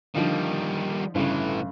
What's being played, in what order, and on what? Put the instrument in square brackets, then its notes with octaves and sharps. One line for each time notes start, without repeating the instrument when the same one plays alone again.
[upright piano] D3 F3 D#4 [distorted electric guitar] D#3 G3
[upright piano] G1 C#3 [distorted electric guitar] A2 E3